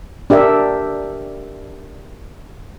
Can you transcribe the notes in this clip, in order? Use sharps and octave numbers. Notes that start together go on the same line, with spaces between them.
D4 G4 A#4 E5